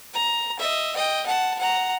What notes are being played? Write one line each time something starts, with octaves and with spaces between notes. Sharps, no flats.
A#5
D#5 E5
D#5 G5
F#5 A5
F#5 A#5